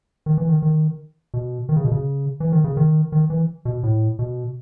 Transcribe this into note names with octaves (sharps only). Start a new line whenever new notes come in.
D#3
E3
D#3
D#3
B2
D#3
C#3
B2
C#3
E3
D#3
C#3
D#3
D#3
E3
B2
A2
B2